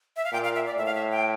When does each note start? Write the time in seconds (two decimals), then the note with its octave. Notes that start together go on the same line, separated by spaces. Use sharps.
0.16 E5
0.25 F5
0.32 A#2 G5
0.44 F5
0.55 E5
0.66 D5
0.78 A2 E5
0.85 F5
0.95 E5
1.11 G5